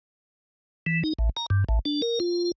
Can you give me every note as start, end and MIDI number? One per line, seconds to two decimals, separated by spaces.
0.86 1.03 52
1.04 1.13 63
1.19 1.29 33
1.37 1.46 82
1.50 1.64 43
1.69 1.79 33
1.85 2.02 62
2.02 2.19 70
2.20 2.52 65